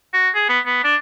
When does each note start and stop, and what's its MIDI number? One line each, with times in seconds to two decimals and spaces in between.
0.14 0.29 66
0.35 0.45 68
0.49 0.59 59
0.66 0.81 59
0.84 0.96 62